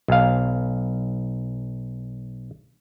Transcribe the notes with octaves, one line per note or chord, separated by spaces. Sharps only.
B1 F5